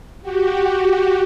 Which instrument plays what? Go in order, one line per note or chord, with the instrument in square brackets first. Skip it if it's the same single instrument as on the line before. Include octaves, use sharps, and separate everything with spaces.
[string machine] F#4 G4